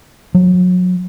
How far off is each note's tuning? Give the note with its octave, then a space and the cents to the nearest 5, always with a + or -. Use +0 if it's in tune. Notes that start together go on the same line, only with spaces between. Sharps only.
F#3 -30